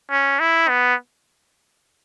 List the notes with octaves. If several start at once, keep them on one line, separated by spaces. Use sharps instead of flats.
C#4
E4
B3